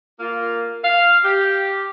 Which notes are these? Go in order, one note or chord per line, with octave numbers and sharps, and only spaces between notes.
A#3 F4
F5
G4